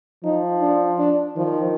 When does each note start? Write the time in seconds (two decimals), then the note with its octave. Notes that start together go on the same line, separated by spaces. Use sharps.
0.24 F3 D#4
0.62 D4
0.99 D4
1.36 D#3 F3